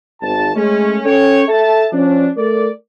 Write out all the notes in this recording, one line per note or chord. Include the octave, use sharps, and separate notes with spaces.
G#1 A5
G#3 A3 C#4
C#4 A4 C#5 G5
A4 E5 A5
F3 C#4 D4
A3 A#4 D5